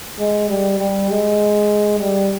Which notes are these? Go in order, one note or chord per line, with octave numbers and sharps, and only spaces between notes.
G#3
G3
G3
G#3
G3